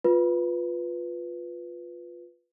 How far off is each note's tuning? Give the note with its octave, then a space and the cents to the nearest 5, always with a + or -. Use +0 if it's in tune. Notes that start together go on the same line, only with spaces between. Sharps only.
F4 +10 B4 +0